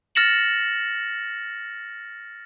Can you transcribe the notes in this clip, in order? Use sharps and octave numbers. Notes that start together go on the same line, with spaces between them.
F6 A6 A#6 C#7 E7 F#7